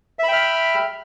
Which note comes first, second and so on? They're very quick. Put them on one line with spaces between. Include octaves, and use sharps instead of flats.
E5 B5 G5 F6